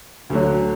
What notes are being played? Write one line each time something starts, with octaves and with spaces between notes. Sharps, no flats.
D2 D3 F#3